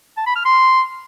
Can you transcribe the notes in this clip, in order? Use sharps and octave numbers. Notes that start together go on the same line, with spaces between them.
A5
B5
F6
C6